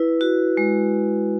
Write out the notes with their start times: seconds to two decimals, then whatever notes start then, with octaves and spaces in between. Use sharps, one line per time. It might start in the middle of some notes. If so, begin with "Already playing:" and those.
Already playing: E4 B4
0.21 F#4
0.57 G#3